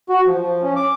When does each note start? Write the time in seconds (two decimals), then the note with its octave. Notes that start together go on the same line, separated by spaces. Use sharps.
0.09 F#4
0.27 F3
0.41 F3
0.63 C#4
0.76 D6